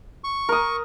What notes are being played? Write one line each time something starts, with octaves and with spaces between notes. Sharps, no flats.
C#6
A#4 D#6